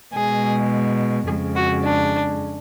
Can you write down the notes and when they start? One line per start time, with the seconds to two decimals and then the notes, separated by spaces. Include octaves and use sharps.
0.14 B2 G#3 G#4
1.27 F2 C#3 G#3 G#4
1.56 F#4
1.84 D4